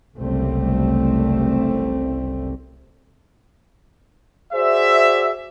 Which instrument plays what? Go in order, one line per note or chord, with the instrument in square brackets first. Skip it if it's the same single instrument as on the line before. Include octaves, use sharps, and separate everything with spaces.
[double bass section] F#1 C2 G3 A3 C4
[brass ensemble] F#4 G#4 C5 D5 E5